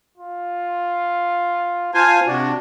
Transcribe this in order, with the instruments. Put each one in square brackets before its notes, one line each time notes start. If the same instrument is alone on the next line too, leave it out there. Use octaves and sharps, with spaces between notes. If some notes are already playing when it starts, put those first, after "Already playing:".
[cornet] F4
[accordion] F4 C5 G#5 [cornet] A5
[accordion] C3 D4 [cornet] F#4